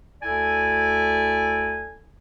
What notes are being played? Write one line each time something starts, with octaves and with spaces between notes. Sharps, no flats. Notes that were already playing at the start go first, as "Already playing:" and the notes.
D2 E4 A4 D5 G#5